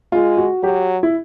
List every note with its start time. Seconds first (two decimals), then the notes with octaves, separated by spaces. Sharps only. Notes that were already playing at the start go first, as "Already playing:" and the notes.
0.12 G#3 F4
0.37 F#4
0.63 F#3 G4
1.03 E4